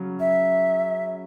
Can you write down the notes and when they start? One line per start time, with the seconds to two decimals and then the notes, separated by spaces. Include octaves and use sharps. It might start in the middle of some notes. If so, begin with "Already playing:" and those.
Already playing: C#3 F#3 C#4
0.20 E5